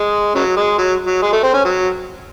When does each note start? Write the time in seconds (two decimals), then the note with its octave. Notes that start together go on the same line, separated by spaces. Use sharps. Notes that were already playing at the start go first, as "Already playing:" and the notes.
Already playing: G#3
0.35 C#3 F#3
0.56 G#3
0.78 F#3
1.06 F#3
1.22 G#3
1.32 A3
1.43 C4
1.54 C#4
1.65 F#3